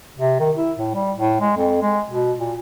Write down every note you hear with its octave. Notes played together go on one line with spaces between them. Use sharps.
C3
D#3
E4
A2
G3
A2
G#3
F2
G#3
B2
A#2